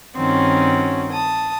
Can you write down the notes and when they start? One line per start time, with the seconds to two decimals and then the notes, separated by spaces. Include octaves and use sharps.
0.16 G2 D#3 C4 C#4 F#4
1.12 A5 D#6